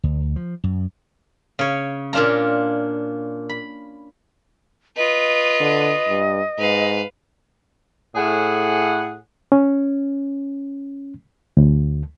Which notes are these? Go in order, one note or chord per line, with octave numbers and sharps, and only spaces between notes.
D2
F3
F#2
C#3 C#5
A#2 C#4 D4 F4 A#5
B5
F4 B4 D#5
D3
G2
G#2 B4 F5
A2 G#4 F#5
C#4
D2